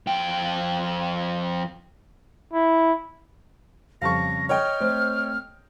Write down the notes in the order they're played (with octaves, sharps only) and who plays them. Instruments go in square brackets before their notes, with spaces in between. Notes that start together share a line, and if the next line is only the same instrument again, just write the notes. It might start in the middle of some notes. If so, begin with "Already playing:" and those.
[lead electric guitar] F2 G5
[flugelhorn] E4
[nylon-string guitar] F2 C#3 G3 [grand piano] F5 A5 C#6 [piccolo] A#6
[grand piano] C#5 D#5 G5 [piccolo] F6
[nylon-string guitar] A3 C4 C5